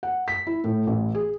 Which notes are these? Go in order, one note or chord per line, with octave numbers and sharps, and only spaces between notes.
F#5
B6
E4
A2
A1
G#4